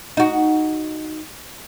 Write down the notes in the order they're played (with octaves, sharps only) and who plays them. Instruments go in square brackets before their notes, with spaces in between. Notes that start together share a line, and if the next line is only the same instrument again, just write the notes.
[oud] D#4 F#4